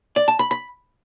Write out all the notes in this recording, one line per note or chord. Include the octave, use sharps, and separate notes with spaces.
D5
A5
B5
B5